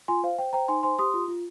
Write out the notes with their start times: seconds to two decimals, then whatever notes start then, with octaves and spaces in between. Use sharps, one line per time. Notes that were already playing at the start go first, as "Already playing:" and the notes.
0.08 F4 G#5 C6
0.23 C5 F5
0.38 C5 G5
0.53 C5 G5 A#5
0.68 D#4 G#5 C6
0.83 C5 G#5 C6
0.99 G4 C6 D#6
1.14 F4
1.28 F4